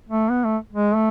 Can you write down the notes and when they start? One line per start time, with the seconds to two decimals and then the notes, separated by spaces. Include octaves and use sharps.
0.09 A3
0.30 B3
0.45 A3
0.73 G#3
0.94 A3